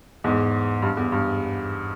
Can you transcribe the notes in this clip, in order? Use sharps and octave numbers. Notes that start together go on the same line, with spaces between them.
E2 G#2
G2
E2
G2